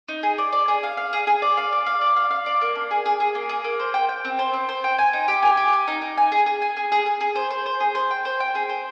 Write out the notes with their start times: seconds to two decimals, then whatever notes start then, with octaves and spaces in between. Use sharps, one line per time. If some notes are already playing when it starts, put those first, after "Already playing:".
0.09 D#4
0.23 G#4
0.38 D5
0.53 D5
0.68 G#4
0.83 F5
0.97 F5
1.13 G#4
1.27 G#4
1.42 D5
1.57 F5
1.72 D5
1.86 F5
2.01 D5
2.16 F5
2.31 F5
2.46 D5
2.62 A#3
2.75 D4
2.91 G#4
3.06 G#4
3.20 G#4
3.35 A#3
3.49 G#4
3.64 A#3
3.79 C5
3.94 G5
4.09 G5
4.25 C4
4.39 C5
4.53 C4
4.69 C5
4.84 G5
4.98 G#5
5.13 D#4
5.28 G4
5.42 G#5
5.57 G4
5.73 G#5
5.88 D#4
6.02 D#4
6.18 G#5
6.32 G#4
6.46 G#4
6.62 G#5
6.77 G#4
6.92 G#4
7.06 G#4
7.21 G#4
7.36 C5
7.51 C5
7.66 C5
7.80 G#4
7.95 C5
8.11 G5
8.25 C5
8.40 G5
8.55 G#4
8.69 C5